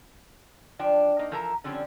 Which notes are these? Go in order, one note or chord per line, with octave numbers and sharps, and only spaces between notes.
F3 D4 G5
A#3 D#4
E3 F3 A4 A#4 C5 A#5
D3 F3 G3 C4 C#4